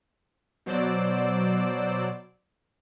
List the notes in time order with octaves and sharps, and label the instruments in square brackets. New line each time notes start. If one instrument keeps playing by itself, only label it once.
[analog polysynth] B2 F#3 C5 D5 E6